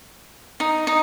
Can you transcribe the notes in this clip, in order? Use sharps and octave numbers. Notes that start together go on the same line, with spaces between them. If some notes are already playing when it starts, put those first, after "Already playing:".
D#4
D#4